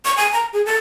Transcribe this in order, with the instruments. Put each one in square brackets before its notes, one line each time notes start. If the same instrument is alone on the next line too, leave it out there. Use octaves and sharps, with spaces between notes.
[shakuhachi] C#6
G#5
A#5
G#4
A4